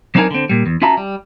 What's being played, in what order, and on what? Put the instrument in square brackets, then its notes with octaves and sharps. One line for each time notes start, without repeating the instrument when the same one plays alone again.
[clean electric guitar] F#3 C4 D4 D#4 A#4 G#5
D3 C4
A#2 G3
E2
C#4 F4 F#4 E5 A5 A#5
G3